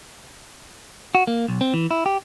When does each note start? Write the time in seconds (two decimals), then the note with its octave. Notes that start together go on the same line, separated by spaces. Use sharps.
1.15 F#4
1.27 A#3
1.48 B1
1.61 C4
1.74 E3
1.91 E4
2.06 G4